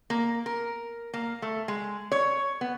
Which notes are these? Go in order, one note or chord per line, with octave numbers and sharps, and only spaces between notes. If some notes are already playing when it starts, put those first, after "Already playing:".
A#3
A#4
A#3
A3
G#3
C#5
B3